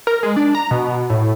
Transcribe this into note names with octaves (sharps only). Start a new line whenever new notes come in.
A#4
G#3
D4
A#5
B2
A2